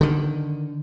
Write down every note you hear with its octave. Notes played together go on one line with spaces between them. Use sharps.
D3 D#3